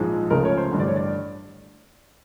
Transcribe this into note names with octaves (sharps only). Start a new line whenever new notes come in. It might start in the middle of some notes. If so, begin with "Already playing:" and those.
Already playing: A#1 G#2 F3 G#3
C#2 C#3 F3 A3 A#4
C#5
C5
A1 G2 D3
D5
C#5
D5